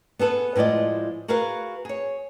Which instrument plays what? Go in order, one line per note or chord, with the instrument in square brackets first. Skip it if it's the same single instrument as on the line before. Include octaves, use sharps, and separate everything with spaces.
[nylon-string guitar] B3 G#4 A4 B4
A2 F3 G#3 D5 D#5
F#4 G#4 A#4 B4 F5
G#4 C#5